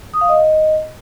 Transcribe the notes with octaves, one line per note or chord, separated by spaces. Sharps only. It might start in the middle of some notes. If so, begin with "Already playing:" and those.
D#6
F5
D#5